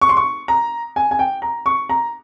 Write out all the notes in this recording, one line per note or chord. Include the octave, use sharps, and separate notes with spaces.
C#6
C6
C#6
A#5
G#5
G#5
G5
A#5
C#6
A#5